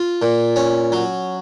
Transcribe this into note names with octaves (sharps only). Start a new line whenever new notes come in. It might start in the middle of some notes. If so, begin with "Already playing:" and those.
Already playing: F4
A#2
C#4
F#3